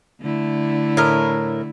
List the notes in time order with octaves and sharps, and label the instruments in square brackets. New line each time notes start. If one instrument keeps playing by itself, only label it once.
[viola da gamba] D3 A3 E4
[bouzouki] A2 A#4